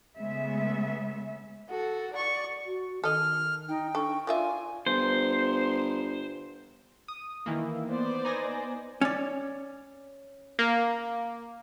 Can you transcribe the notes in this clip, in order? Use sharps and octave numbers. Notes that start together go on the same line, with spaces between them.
C#3 G#3 A3 B3 E5
F#4 A4
D5 C#6
F#4
D#3 A4 D#5 F6
D#4 G5
D4 A4 C#6
D#3 F4 D5 E5 F5 G#5
G1 C5
D#6
D#3 E3 A#3 E4
B3 C5 D5
D#4 G#5 A#6
C#4 D5
A#3